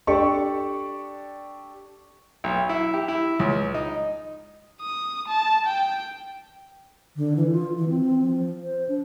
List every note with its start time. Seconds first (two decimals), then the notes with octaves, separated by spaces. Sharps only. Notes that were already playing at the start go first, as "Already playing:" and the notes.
0.07 D4 G4 A4 D5 C#6
2.44 B1
2.69 E4
2.94 G4
3.08 E4
3.39 C#2
3.74 D#4
4.81 D#6
5.28 A5
5.67 G5
7.17 D3
7.36 E3
7.52 F4
7.77 E3
7.89 C4
8.22 F3
8.62 C5
8.89 D4